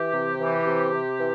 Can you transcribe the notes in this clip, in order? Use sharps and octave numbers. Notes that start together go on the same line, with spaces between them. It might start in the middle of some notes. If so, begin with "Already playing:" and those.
Already playing: E3 G4
C3
E3
C3
C3
E3